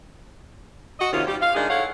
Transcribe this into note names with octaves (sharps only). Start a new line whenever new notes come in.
F#4 D#5
D#2 C3 D#3 C#4 F4
G3 G4
F5
D#3 G#3 D4 G#4
E4 A4 C#5 F5 F#5